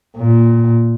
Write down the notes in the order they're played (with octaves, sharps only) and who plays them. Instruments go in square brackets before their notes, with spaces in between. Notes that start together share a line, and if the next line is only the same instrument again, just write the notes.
[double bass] A#2